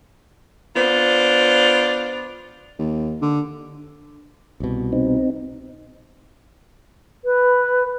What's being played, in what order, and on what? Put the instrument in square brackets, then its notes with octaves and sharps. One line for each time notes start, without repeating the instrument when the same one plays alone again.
[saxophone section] B3 D4 F4 C5
[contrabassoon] D#2
D3
[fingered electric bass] C2 B2
[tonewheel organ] C4 D#4
[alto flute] B4